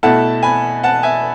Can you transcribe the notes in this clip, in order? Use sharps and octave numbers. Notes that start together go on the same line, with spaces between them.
B2 A3 E4 F#5 A5
G#5 B5
F#5 A5
E5 G#5